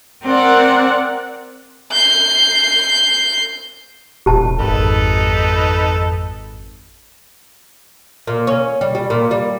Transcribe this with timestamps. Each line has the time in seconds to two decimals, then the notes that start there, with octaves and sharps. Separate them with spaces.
0.25 C4 A#4 D5 F#5
1.92 G6 C7
4.26 E1 A#2 G4 A5
4.59 G#1 F2 D#4 A4 B4
8.27 A#2
8.47 C#4
8.81 G3
8.95 G3
9.10 A#2
9.31 G3